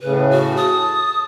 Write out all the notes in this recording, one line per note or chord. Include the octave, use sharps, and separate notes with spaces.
A2 C#3 B4
F#4
A5 D#6